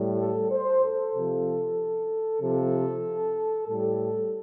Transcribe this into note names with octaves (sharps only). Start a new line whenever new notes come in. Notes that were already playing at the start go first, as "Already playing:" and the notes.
Already playing: A2 G3
A4
C5
A4
C3 F3
C3 F3 A4
A2 G3 A4